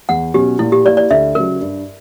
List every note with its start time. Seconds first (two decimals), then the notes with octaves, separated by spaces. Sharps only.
0.09 E2 F#5
0.34 B2 F#3 C#4 G4
0.59 A#2 E4
0.72 G4
0.84 A#3 E4 G4 D5
0.97 D5
1.11 D2 E5
1.35 C#3 F#3 A#4
1.61 G2